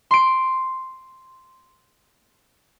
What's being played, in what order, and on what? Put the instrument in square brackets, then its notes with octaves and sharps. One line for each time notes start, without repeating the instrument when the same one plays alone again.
[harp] C6 D7